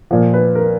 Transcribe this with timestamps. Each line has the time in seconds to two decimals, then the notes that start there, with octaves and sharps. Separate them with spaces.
0.11 A#2 F3
0.34 B4
0.55 A#4